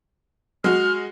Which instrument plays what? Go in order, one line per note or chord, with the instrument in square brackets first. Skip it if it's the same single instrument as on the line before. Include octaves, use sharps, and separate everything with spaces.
[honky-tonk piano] G#3 F#4 [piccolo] F6